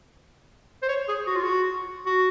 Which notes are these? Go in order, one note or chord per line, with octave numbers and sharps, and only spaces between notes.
C5
C#5
G#4
F#4
F4
F#4
F#4